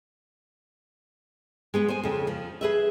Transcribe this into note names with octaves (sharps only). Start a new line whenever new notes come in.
G#3 B3 G#4
C5 G#5
F2 C#3
F3
G#4 B4 E5